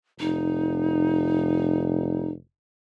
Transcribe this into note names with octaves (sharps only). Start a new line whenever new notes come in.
F1 D#4